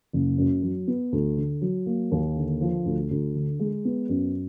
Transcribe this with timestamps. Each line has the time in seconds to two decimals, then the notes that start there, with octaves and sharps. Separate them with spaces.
0.13 F#1
0.38 F#2
0.63 F#3
0.88 B3
1.12 D2
1.37 D3
1.61 F#3
1.86 A#3
2.11 D#2
2.36 D3
2.61 F3
2.85 D2
3.11 D2
3.35 D3
3.60 G#3
3.85 B3
4.09 F#2